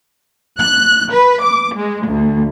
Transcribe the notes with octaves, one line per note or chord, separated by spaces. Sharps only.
F#6
B4
D6
G#3
D2